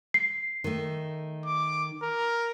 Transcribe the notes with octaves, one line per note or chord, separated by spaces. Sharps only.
C7
D#3 A3
D6
A#4